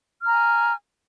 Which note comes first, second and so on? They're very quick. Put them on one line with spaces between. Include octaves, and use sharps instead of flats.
F6 A#5 G#5